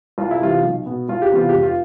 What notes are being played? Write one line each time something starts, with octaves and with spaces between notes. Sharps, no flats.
C2 F4
E4
C3 E3 G3 F4
B1
B2 B3
C2 F4
G4
C3 E3 B3 F4
G4
F1
F4